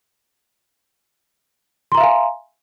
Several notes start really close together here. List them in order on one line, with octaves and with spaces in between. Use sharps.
C6 A#5 E5 F5 G#5